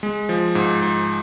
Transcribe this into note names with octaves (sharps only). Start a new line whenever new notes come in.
G#3
F3
G#2
G#2